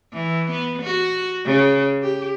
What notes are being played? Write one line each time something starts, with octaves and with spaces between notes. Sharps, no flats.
E3
B3
F#4
C#3
G4